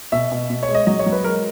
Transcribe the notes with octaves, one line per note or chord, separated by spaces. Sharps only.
B2 E5
B2
B2
C#5
G#3
D#5
F#3 D#5
C#5
F#3
B4
G#3 A#4